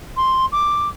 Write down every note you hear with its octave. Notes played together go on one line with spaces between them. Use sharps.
C6
D6